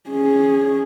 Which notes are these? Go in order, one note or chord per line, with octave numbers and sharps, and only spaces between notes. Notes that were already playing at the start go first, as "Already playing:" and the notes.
C#4 G#4